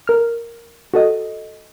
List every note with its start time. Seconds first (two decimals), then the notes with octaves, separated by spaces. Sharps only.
0.07 A#4 F6
0.94 F#4 A4 D#5